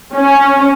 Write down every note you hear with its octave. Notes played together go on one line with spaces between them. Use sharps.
C#4